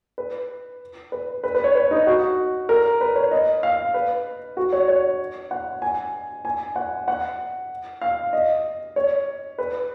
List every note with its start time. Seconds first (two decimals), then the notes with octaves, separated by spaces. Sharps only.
0.18 B4
1.12 B4
1.44 B4
1.55 B4
1.64 C#5
1.75 B4
1.91 D#4
2.07 F#4
2.69 A#4
3.01 B4
3.16 C#5
3.31 D#5
3.63 F5
3.94 B4
4.57 F#4
4.72 C#5
4.88 C#5
5.51 F#5
5.82 G#5
6.45 G#5
6.76 F#5
7.08 F#5
8.01 F5
8.33 D#5
8.96 C#5
9.59 B4